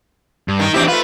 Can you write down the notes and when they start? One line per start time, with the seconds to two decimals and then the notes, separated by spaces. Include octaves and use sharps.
0.48 G2
0.59 D#3 D#4
0.74 E2 C4 D4 E4 G4
0.88 A3 F4 B4